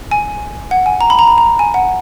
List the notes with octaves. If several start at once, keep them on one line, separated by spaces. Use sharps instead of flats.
G#5
F#5
G#5
A#5
B5
A#5
B5
A#5
G#5
F#5